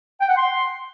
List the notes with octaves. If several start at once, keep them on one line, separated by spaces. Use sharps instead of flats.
G5
F#5
C6